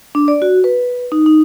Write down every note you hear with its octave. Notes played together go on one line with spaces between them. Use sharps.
D4
D5
F#4
B4
D#4
D#4